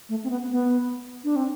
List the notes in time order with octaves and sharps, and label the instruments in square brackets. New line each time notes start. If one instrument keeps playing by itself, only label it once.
[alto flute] A3
C4
B3
B3
D4
C4